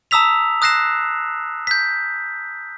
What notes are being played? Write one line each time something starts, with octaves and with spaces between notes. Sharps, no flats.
A5 A#5 D#6 E6 B6 F7
D#6 F#6 A#6 C7 E7
G6 B6